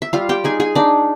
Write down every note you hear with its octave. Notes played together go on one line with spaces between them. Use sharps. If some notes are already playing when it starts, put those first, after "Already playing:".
E5
G3 F4 F5
G4 G5
D#4 G#4 G#5
G#4 G#5
D4 D#4 D5